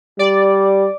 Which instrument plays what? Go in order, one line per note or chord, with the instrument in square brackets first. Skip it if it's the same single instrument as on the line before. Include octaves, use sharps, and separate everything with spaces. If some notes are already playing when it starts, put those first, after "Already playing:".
[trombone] G3 [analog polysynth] D5